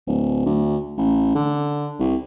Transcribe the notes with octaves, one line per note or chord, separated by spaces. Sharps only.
D1
D2
A1
D3
C2